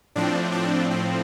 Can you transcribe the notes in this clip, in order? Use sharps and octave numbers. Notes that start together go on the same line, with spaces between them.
A2 F3 C4 D4
D4
C4